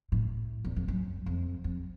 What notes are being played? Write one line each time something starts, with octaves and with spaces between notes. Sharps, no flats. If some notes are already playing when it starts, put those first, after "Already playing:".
A2
E2
F2
F#2
F2
F2